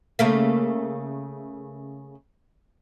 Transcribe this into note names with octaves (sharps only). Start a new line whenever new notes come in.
C#3 A3 A#3